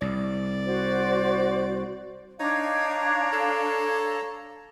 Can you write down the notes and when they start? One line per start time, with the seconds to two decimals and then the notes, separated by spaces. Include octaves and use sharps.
0.01 C2 D5
0.65 F#4 C5
2.40 D4 D#4 C#5 F5 A#5 G#6
3.33 A4